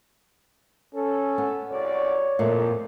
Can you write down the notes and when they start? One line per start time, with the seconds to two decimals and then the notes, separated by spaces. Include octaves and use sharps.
0.95 C#4 A4
1.38 B3
1.71 C2 F#2 C#5 D5
2.39 F2 A#2 A3